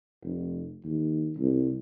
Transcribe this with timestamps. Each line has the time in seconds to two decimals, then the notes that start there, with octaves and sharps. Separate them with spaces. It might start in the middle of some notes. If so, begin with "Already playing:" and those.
0.24 F1
0.84 D#2
1.38 C2